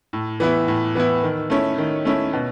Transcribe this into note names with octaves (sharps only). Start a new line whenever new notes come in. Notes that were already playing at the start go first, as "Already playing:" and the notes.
A2
E3 B3 E4
A2
E3 B3 E4
D#3
A3 C#4 E4
D#3
A3 C#4 E4
B2